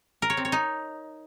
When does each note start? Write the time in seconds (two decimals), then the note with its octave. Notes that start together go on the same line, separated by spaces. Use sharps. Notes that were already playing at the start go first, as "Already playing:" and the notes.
0.22 A#4
0.30 C#5
0.37 C4
0.45 C#5
0.52 D#4